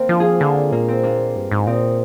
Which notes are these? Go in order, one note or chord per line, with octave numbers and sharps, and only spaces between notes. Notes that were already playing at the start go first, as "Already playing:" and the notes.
Already playing: A#3 C4
F3 D4 F4
F4 G#4
D3 A#3 D4
A#2 A#3
C4
A#3 D4
G2
G#2
A#2 C4 D#4